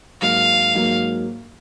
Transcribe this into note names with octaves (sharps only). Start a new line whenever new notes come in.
G#2 F#3 A#3 F5
G#2 F#3 A#3